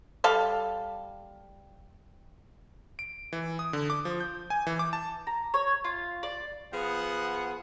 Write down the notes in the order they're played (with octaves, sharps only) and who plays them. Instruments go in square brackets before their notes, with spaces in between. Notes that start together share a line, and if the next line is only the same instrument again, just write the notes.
[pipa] G3 A4 F5
[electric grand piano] D7
E3
D#6
D3
D6
F3
G6
G#5
E3
D6
A5
[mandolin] A#5
C#5
F4
D5
[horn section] F3 B3 G#4 F#5